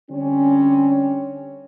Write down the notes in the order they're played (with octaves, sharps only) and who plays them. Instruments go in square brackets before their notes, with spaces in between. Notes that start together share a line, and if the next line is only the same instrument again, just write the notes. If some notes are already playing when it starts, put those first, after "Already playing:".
[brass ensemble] D3 G3 C4 C#4